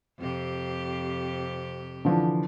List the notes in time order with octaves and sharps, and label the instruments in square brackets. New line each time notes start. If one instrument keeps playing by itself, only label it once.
[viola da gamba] F2 C3 G4
[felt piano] D3 E3 F3